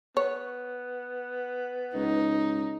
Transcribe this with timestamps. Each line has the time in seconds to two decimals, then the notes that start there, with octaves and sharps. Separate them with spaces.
0.17 B3 C#5
1.95 C#2 D#4